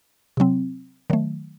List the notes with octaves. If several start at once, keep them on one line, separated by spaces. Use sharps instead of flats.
C3 F#3 C4
D#3 F#3 A3